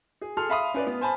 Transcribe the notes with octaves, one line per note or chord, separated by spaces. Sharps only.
G#4
G#4 A4 C6 F6
E5 F5 B5 C6 D#6
C#4 B4 D5
B3
C5 G#5 A5 B5